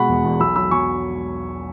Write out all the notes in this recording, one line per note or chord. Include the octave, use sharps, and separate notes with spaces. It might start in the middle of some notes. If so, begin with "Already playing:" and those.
Already playing: B2 G#3 F#5 B5 C#6
E1
E2
B1 B5 E6
F#3 B5 E6
B1 G#5 C#6